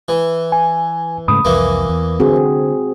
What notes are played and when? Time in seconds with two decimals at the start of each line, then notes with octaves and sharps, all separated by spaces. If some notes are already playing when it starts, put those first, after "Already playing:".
0.09 E3
0.52 G#5
1.28 G#2 C#3 A3 B5 D#6
1.45 C2 F2 E3 A#3
1.89 E2
2.20 D3 C4 F#4 G#4